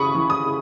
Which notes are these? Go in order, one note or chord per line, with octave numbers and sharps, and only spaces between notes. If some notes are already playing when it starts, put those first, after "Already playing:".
Already playing: C#3 E3 B5 C#6 D#6
E3
D#6
C#3